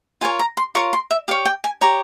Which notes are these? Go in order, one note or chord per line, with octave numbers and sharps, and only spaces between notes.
F4 A#4 C#5 G#5
A#5
C6
F4 A#4 C#5 C#6
C6
E5
G4 C#5 F5
G5
G#5
G4 C#5 A#5